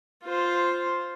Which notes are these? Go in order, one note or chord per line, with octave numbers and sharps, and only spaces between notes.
F4 C5